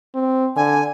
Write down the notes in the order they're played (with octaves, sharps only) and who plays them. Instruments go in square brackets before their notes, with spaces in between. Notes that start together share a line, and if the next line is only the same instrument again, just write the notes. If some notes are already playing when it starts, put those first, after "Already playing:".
[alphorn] C4
[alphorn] D3 [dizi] G#5